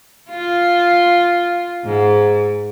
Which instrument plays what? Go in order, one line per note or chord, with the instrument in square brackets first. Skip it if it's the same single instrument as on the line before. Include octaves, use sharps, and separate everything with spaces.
[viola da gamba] F4
G#2